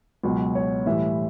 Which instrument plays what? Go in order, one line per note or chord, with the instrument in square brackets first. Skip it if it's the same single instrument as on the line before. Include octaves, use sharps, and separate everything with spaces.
[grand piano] C#2 B2 F#3
C#5
A2 E3 G3 E5